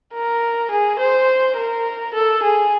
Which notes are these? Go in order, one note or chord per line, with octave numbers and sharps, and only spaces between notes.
A#4
G#4
C5
A#4
A4
G#4